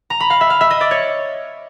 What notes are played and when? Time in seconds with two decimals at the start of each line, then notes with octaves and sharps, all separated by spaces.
0.10 A#5
0.20 B5
0.30 F5
0.41 E5
0.50 F5
0.61 E5
0.71 D#5
0.81 D5
0.91 C#5